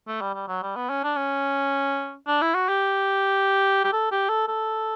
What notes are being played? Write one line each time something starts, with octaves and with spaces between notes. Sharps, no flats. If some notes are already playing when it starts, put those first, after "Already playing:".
A3
G3
G3
F#3
G3
B3
C#4
D4
C#4
D4
E4
F#4
G4
G4
A4
G4
A4
A4